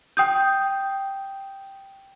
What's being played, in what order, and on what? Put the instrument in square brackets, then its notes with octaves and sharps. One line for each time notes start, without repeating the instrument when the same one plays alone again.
[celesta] G5 D#6 G6